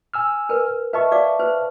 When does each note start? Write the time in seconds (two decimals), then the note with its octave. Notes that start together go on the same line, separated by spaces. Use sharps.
0.14 G#5 E6 F6
0.49 A#4 B4
0.93 B4 D#5 E5 A5 C#6
1.12 D5 F5 D6
1.40 B4 C5